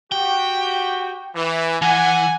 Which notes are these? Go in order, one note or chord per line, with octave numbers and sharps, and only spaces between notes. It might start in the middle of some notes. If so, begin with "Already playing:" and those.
F#4 G4 G5
E3
E3 F#5 G#5